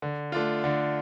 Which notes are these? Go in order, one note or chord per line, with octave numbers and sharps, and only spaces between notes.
D3
A3 D4 F4
D3